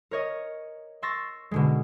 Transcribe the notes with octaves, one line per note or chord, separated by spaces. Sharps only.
A#4 C#5 D#5
C6 C#6 E6 A6 A#6
B2 D3 G#3